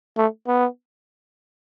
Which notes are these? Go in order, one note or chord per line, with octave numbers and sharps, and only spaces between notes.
A3
B3